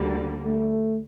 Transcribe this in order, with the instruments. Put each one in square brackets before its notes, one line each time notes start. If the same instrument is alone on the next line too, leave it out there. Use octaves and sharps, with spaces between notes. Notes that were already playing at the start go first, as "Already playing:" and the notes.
Already playing: [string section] D2 D3 G3 A#3
[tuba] A3